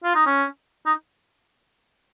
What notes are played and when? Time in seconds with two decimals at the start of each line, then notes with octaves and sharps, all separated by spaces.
0.04 F4
0.15 D#4
0.26 C#4
0.86 D#4